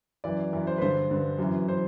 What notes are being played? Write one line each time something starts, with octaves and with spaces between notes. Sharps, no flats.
F#2 E3 D5
F#2 E3
C5
B4
G2 D3 C5
G2 D3
F#2 E3
E3 C5